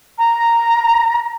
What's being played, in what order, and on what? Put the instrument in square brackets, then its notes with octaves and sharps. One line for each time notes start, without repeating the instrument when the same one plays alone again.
[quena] A#5